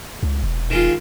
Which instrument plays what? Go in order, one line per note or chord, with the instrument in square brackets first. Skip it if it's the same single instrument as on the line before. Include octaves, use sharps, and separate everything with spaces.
[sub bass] C#2
E1
[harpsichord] D#3 G#3 F4